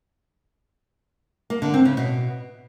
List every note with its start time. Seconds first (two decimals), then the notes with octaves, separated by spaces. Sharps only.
1.50 A#3
1.62 D3
1.74 C4
1.85 C#3
1.97 B2